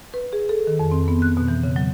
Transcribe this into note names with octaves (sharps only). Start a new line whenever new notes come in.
B4
G#4
A4
D#3
F2
C4
B3
F#6
B2
E3
C#3
F#3